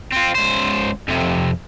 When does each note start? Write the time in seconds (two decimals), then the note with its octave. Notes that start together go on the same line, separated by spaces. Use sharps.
0.12 C4 F4
0.35 C#2 C5
1.08 F2 C3